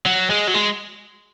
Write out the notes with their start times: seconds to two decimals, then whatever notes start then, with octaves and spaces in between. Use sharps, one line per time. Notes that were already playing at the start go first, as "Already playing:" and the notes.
0.06 F#3
0.30 G#3
0.47 F#3
0.54 G#3